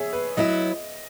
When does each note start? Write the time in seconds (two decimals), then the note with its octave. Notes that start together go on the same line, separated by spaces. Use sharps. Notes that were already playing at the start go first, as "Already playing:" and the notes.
Already playing: G#4 C#5 E5
0.13 B4
0.37 F#3 B3 E4 D#5